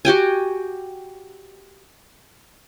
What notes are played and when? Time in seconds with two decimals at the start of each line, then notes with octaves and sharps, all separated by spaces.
0.05 F#4 G4 G5 G#5